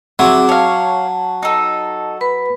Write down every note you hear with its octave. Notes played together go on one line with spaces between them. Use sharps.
F#3 C4 G#4 E5 D6
C#5 F5 A5
D#4 A4
B4 B5